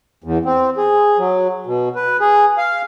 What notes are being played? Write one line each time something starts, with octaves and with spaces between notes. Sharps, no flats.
E2
C4
G#4
F#3
B2
B4
G#4
F5